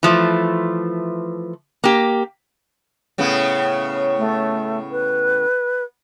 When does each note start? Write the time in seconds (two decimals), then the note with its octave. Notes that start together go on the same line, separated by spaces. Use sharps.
0.03 E3 F3 A3
1.84 A#3 G4
3.18 A2 C#3 B3
4.17 A3
4.91 B4